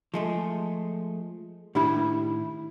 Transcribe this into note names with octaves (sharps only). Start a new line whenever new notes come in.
F3 G#3 A3
A2 D#3 D4 E4 G4 B5